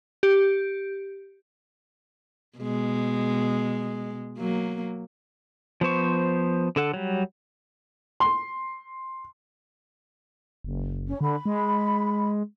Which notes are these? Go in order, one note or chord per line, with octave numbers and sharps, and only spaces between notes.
G4
B2 G#3
F#3 A#3
F3 B3 C5 C#6
D3 A4 F#5
F#3 G3
C6
F#1
C#4
D3 B5
G#3